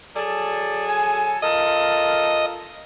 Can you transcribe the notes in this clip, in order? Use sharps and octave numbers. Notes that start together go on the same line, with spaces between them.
F#3 G#4 A4 D5
G#5
F4 A4 A#4 D#5 A5